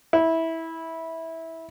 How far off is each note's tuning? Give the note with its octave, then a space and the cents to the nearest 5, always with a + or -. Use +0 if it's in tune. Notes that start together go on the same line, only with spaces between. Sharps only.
E4 -15